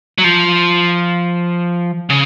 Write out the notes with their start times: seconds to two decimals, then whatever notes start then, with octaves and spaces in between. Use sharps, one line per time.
0.18 F#3
0.24 F3
2.10 C#3